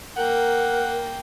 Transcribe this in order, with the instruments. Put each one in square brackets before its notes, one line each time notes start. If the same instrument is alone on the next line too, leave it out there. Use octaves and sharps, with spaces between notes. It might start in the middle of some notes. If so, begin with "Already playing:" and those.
[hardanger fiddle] A#3 G5 [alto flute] A#4 [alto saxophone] F#5